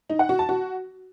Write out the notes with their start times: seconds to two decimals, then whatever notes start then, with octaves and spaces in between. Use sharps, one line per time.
0.10 D#4
0.19 F#5
0.29 F#4
0.39 A5
0.49 F#4